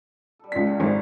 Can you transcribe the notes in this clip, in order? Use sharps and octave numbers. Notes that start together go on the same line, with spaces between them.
G3 A4
C#2 B6
A#2 C#3 F5
G#1 D3 E3